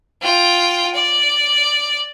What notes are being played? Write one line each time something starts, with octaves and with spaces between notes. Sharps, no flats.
F4 G5
D5